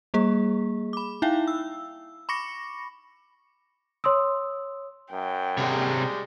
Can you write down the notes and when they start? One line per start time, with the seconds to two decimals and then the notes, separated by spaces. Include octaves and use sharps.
0.14 G3 A#3 G#4
0.93 B5 D6
1.22 D#4 E4 E5 F5 G5
1.48 E6
2.29 B5 C#6 D6 A#6 C#7
4.04 C#5 C6 D#6 E6
5.12 F#2 G5
5.58 C3 G3 G#3 C#5